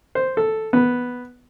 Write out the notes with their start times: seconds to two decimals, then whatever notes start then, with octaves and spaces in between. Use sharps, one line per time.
0.15 C5
0.37 A4
0.73 B3